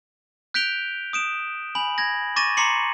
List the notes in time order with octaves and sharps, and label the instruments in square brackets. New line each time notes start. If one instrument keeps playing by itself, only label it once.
[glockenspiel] F#6 G6 B6 D7 F7 G7
D#6 D7 E7
G#5 B5 F#7
G#6 A#6
C#6 D6 A6 A#6 D#7 E7
A#5 C6 D6 C7 C#7 F#7